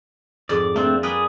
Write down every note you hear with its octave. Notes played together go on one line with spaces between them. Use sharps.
F2 G#2 D5
A3 A#3 C4 D4 F4
G#4 A#4 B4 D5 G5